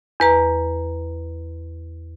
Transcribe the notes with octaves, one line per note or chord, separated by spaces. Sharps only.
E2 B4 A#5